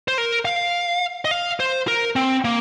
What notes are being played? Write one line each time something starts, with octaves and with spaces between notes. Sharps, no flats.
C5
A#4
F5
D#5
F5
C5
A#4
C4
A#3